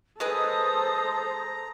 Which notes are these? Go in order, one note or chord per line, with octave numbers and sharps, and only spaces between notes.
G#3 G#4 A4 B4 C5 A#5 D#6